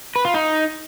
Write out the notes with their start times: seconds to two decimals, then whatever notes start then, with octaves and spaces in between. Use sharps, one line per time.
0.16 B4
0.25 F4
0.34 D#4